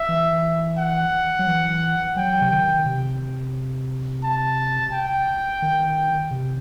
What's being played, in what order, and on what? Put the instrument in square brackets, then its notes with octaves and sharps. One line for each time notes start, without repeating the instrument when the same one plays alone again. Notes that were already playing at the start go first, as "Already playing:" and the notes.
Already playing: [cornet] E5
[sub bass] E3
[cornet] F#5
[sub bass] F#3
E3
[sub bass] F#3 [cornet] G5
[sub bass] C3
[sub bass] D#3 [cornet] G5
[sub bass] C3
[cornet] A5
G5
[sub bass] D#3
C3